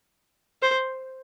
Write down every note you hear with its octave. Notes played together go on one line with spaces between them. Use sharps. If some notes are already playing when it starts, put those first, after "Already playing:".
C5